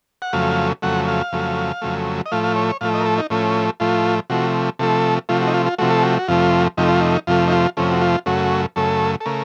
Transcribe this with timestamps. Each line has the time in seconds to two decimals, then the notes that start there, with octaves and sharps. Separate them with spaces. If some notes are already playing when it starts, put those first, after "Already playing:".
0.22 F#5
0.33 F2 C#3 F#3 A3 F5
0.82 F2 C#3 F#3 A3 F#5
1.08 F5
1.32 F2 C#3 F#3 A3
1.82 F2 C#3 F#3 A3
2.26 D#5
2.32 A2 F3 A3 F5
2.44 F5
2.56 C#5
2.69 C#5
2.81 A2 F3 A3 F5
2.94 D#5
3.01 A#4
3.06 A4
3.18 D#4
3.30 A2 F3 A3 C#4
3.80 A2 F3 A3 F4
4.30 C3 F3 A3 F#4
4.79 C3 F3 A3 A4
5.29 C3 F3 A3 F4
5.41 F#4
5.47 D#4
5.54 F4
5.66 F4
5.79 C3 F3 A3 F#4
5.91 A4
6.03 F#4
6.19 F#4
6.28 F2 C3 F3 A3 F4
6.77 F2 C3 F3 A3 D#4
6.89 F4
7.01 D#4
7.27 F2 C3 F3 A3 F4
7.48 D#4
7.52 F4
7.77 F2 C3 F3 A3 C#4
7.91 F#4
8.02 F4
8.26 F#2 C#3 A3 F#4
8.76 F#2 C#3 A3 A4
9.20 A4
9.26 C#3 A3 A#4